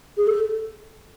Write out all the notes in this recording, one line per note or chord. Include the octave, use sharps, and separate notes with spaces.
G#4
A4